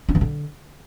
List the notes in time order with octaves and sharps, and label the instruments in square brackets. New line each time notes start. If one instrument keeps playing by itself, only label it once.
[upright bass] D4
E3
D3